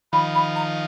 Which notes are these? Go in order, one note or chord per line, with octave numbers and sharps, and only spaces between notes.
D#3 F3 B5
B5
A#5